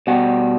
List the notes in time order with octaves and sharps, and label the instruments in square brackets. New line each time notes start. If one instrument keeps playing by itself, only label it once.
[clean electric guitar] B2 G3 F#5